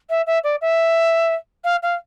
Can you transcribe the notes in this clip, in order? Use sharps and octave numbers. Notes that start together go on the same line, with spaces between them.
E5
E5
D5
E5
F5
F5